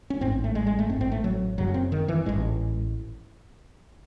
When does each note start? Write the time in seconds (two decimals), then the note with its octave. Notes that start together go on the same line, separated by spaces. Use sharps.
0.10 C#4
0.21 A1 G#2 C4
0.32 C4
0.44 A3
0.55 G#3
0.67 G#3
0.79 A3
0.89 A1 G#2 C4
1.01 C4
1.12 A3
1.24 F#3
1.58 F#1 F#2 C#3 F#3
1.74 C4
1.92 D#3
2.08 E3
2.25 A1 G#2 G#3